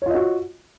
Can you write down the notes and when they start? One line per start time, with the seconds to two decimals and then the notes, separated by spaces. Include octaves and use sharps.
0.02 C#5
0.06 F4
0.10 D#5
0.15 F#4